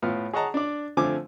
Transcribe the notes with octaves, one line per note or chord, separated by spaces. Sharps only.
A2 B3 F4 F6
G#4 C#5 D#5 F#5 A5 A#5
D4 D5
D3 F3 A3 C4 G#5 D6